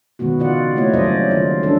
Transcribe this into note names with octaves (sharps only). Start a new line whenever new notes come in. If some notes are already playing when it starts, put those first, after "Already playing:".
B2 D#3 G#3 B3 F#4
C#3 F4 D5 F#5
A3 A#3 E4 C#5 D#5
F#3 G3 C#4 C5 D5 D#5
D#3 F4 D#5
E3 G3 C#4 D4 E4 A4